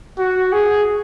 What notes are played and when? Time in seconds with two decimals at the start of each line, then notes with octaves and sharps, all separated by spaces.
0.18 F#4
0.52 G#4